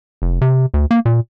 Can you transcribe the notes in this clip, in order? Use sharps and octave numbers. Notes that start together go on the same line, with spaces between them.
F1
C3
D2
A#3
A#2